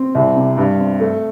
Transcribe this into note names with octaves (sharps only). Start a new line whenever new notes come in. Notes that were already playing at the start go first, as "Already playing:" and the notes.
Already playing: C4
C2
C3
G2
C4
A3